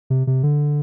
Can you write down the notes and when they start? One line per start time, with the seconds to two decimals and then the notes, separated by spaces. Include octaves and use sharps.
0.10 C3
0.27 C3
0.43 D3